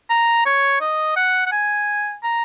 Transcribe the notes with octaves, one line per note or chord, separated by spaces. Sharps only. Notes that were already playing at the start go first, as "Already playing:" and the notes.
A#5
C#5
D#5
F#5
F#5
G#5
A#5